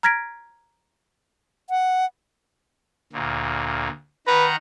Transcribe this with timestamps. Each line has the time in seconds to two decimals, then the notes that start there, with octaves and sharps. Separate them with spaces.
0.03 A#5 F6 G#6 A#6 B6 D7
1.70 F#5
3.13 D2 A#2
4.27 D#3 B4 F#5 A#5